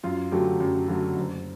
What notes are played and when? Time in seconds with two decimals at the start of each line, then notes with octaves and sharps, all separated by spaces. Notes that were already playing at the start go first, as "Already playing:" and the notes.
0.03 F#2 F4
0.32 D3 F#3 A3 G4
0.60 F#2
0.88 D3 F#3 A3
1.17 F#1